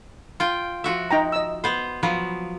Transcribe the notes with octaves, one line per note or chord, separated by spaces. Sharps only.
F4 G5
F3 F#4 E5
D#4 G5 A#5
D#5 E6
B3 C5
F3 F#3 B3